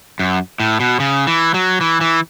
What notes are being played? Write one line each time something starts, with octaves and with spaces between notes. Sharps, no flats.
F#2
A2
B2
C#3
E3
F#3
E3
E3